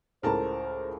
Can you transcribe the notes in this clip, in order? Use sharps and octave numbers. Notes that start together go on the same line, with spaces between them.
C#2 A2 A#4 C5 A5